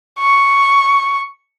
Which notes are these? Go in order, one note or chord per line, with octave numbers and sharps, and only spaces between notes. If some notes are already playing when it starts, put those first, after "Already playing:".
C#6